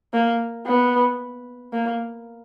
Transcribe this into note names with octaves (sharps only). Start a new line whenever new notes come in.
A#3
B3
A#3